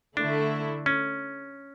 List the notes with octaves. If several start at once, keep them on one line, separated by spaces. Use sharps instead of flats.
D3 A3 D4 E4
C#4